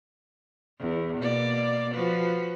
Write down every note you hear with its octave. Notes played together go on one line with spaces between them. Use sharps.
E2
B2 A#3 D5
F3 F#4 B4